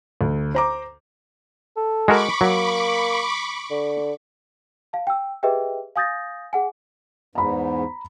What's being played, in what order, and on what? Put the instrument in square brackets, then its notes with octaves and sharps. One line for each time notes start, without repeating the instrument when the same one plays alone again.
[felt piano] D2
C5 A#5 D6
[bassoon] A4
[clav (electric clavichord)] G#3 F#4 A#4 [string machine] B5 C#6 D6
[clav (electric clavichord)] F#3 [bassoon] A#3
[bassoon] D3
[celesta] F5 A5
G5 E6
G4 G#4 B4 D#5 E5 G5
F5 G#5 D#6 G6 A6 A#6
G#4 F#5 G#5
[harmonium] E2 G#2 [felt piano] A#5 B5